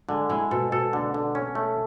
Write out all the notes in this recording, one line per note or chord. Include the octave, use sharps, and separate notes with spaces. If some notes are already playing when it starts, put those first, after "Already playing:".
D3 G#3
G#3 E4
B2 A4
B2 A4
D3
D3
C#4
A3